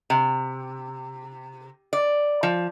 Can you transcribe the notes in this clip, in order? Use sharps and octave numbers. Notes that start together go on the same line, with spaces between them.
C3
D5
F3